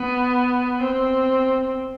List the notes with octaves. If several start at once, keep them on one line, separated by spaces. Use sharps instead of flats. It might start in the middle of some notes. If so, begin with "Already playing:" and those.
Already playing: B3
C4